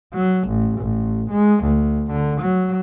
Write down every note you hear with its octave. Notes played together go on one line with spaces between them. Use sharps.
F#3
A1
A1
G#3
D2
D3
F#3